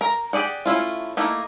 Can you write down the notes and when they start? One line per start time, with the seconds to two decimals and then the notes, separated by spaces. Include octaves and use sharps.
0.01 A#4 A#5
0.33 G4 G#4 D5 F#5
0.66 A3 C#4 E4 F4
1.17 A3 A#3 D#4 E4